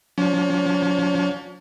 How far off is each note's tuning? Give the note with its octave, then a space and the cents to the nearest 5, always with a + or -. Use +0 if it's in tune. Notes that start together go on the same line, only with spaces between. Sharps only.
F3 +40 C#4 +40